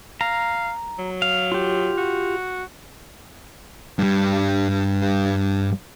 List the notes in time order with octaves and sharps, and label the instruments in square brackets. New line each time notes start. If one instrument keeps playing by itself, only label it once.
[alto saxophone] F5 [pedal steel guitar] A#5
[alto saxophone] F#3
[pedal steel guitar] F5
F4 G4
[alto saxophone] F#4
[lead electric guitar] G2 G3